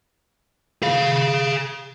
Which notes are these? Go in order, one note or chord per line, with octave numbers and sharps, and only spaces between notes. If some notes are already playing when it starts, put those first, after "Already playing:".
G#4 F5